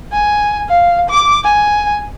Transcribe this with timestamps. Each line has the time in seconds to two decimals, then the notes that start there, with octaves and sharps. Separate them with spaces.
0.12 G#5
0.69 F5
1.10 D6
1.44 G#5